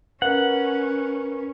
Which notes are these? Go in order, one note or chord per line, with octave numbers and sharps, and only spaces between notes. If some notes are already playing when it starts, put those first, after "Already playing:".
C#4 A#4 B4 F#5